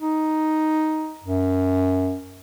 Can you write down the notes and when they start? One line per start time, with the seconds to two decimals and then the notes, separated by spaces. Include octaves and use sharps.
0.01 D#4
1.23 F#2